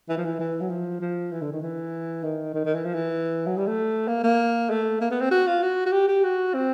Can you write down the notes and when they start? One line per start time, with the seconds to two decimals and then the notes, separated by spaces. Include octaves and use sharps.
0.09 E3
0.17 F3
0.25 E3
0.39 E3
0.61 F#3
0.70 F3
1.01 F3
1.32 E3
1.42 D3
1.52 D#3
1.62 E3
2.23 D#3
2.54 D#3
2.65 D#3
2.74 E3
2.85 F3
2.94 E3
3.47 F#3
3.57 G3
3.67 A3
4.08 A#3
4.23 A#3
4.70 A3
5.01 A#3
5.11 B3
5.21 C4
5.31 F#4
5.47 F4
5.62 F#4
5.86 F#4
5.92 G4
6.08 G4
6.24 F#4
6.54 C4